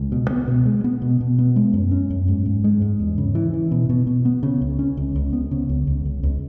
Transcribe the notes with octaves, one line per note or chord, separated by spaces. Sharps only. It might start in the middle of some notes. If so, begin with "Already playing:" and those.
Already playing: C#2
B2
B3
B2
G#3
B3
B2
B2
B3
G#3
F#2
C#4
F#2
G#2
G#2
G#3
G#2
E2
C#3
E3
E3
B2
B2
B2
B3
C#3
C#2
C#4
C#2
C#2
B3
C#3
C#2
C#2
C#2
C#2